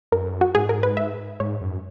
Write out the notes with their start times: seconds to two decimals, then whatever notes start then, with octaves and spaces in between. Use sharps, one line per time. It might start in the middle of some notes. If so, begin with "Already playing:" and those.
0.12 F#2 A#4
0.41 F#4
0.55 G#2 G#4
0.69 A#4
0.83 B4
0.97 E5
1.40 G#2 C#5
1.61 F#2